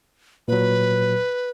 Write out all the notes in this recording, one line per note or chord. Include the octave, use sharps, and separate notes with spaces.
A#2 F#3 B4